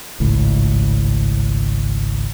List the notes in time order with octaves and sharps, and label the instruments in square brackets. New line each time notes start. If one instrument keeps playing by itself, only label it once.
[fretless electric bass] G#1 C#2 A2